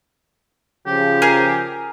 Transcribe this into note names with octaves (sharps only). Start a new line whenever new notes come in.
C#3 F3 G4
G#4 A#4